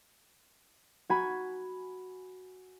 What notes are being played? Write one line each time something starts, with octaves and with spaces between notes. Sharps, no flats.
F#4 G#5 B5